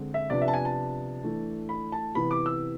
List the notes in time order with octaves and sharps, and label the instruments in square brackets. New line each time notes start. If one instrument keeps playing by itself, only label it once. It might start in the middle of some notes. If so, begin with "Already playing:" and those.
Already playing: [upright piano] D3 G#3 C4
E5
C3 F3 B3 D4 D5
E5
A5
G#5
A5
E3 A3 D4
B5
A5
C3 E3 B3 B5
D6
E6